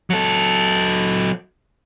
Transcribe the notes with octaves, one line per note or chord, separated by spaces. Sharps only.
F#3 A4